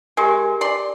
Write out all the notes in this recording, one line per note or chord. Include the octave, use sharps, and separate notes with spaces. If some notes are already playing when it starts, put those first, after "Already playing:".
G#3 G4 A#4 G#5
D5 C6